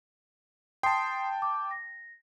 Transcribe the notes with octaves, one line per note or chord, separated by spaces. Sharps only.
G5 A5 C6 D#6 C7
D6
A#6